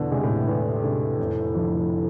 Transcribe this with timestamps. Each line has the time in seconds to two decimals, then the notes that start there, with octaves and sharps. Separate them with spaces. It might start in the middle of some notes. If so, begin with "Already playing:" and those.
Already playing: E2 B2 D3
0.11 C3 G#3 D4
0.23 A2
0.47 E2
0.84 C3 G#3 D4
1.19 F1
1.55 F2 D3 F3